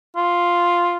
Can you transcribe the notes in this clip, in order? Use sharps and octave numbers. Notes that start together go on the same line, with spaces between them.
F4